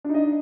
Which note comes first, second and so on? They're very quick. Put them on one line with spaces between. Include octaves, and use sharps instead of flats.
D4 D#4 D#5